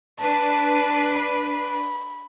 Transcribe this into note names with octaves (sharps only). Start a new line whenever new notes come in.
D4 B4 A5
B5